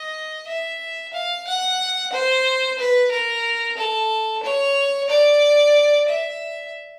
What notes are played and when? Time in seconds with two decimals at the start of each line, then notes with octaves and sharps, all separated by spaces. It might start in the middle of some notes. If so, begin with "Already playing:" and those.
Already playing: D#5
0.47 E5
1.13 F5
1.47 F#5
2.12 C5
2.78 B4
3.11 A#4
3.77 A4
4.43 C#5
5.09 D5
6.08 E5